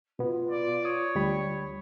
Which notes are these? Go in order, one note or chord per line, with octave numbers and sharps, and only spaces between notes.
B2 B3 F4
D5
C#5 D#6
D2 G3 B5